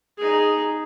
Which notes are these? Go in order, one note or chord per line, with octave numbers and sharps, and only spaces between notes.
D#4 G#4